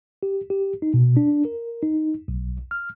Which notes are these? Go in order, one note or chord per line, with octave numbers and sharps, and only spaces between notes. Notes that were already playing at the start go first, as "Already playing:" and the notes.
G4
G4
D#4
B2
D4
A#4
D#4
B1
F6